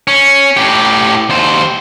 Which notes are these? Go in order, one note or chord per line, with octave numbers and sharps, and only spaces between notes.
C#4
A2 G4
D#2 C5